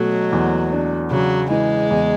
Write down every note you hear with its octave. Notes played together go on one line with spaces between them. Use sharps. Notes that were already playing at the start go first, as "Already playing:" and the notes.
Already playing: B2 F#3 A3
E2
D4
C#3 F#3
E3 G#3
E2